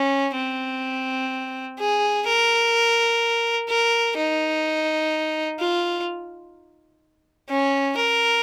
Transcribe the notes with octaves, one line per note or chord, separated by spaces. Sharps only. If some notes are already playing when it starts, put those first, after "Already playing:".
Already playing: C#4
C4
G#4
A#4
A#4
D#4
F4
C#4
A#4